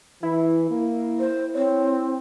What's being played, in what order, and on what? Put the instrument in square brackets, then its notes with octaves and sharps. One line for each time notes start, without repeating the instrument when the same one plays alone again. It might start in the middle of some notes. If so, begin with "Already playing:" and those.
[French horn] E3 [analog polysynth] E4
[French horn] A#3
[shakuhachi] C5
[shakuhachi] C4 [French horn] C#5